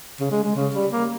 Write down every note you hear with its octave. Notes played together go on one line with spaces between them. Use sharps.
C#3
G#3
G#3
C#3
G3
A#3